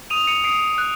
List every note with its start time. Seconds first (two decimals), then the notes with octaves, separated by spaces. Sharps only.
0.10 D#6 D#7 F7
0.27 C#7 D#7
0.44 D#6 C7 D7
0.78 F#6